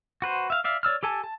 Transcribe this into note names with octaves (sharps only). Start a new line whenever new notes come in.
F#4 B4 C5
E5 F5
D5 E5 F5
C#5 D5 E6 F6
G4 A4 G#5 A5
A5